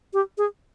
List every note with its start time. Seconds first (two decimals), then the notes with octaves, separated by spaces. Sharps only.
0.13 G4
0.38 G#4